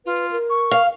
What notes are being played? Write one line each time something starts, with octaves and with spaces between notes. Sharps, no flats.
F4 B4
A#4
C#6
F5